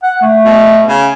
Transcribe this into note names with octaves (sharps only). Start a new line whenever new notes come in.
F#5
A3
B2
C#3